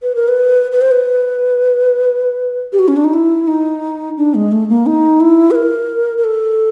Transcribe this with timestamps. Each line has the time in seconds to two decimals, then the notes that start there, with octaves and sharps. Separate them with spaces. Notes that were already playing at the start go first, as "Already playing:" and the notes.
0.03 B4
0.15 A#4
0.28 B4
0.72 B4
0.81 C5
0.92 B4
2.73 G4
2.79 F#4
2.88 C#4
2.96 D4
3.04 D#4
3.13 E4
3.47 D#4
4.17 D4
4.35 G#3
4.52 A3
4.69 A#3
4.86 D#4
5.21 E4
5.51 B4
5.55 A#4
6.18 A#4
6.24 A4